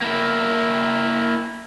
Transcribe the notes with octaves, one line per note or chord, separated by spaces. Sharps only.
A#3 E4